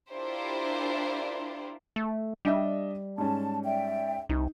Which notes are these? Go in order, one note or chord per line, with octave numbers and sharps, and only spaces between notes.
D4 E4 F4 G4 A#4 C5
A3
G3 D4 D#5 E5
G#2 C#4 A5
D5 E5 G5
C2 D#4